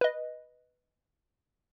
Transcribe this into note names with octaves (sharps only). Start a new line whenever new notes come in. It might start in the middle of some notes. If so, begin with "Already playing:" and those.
B4 D#5